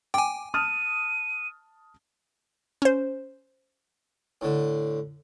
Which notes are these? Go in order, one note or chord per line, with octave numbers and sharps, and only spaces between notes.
G5 G#5 D6
A5 D#6 F6 D#7
C#4 C5
A2 D3